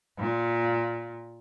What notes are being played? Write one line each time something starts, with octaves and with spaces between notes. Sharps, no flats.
A#2